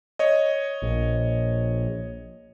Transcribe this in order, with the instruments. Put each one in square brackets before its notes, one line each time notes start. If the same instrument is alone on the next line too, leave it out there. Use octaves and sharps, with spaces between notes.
[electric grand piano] C#5 D#5
[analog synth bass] A#1